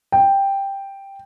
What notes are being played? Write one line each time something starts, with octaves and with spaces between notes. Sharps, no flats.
G5